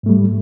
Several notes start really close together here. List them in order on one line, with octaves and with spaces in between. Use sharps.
G#2 A3 G3